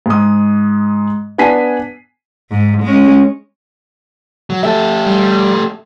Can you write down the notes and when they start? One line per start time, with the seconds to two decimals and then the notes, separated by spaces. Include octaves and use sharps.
0.06 G#2 D#6
1.38 B3 D4 G#5 B6 C7 D#7
2.51 G#2
2.83 G#3 C#4
4.50 F#3
4.63 A3 G4 A4 E5
5.07 G3